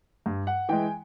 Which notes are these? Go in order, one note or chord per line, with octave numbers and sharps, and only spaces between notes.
G2
F#5
E3 G#3 G5
G#5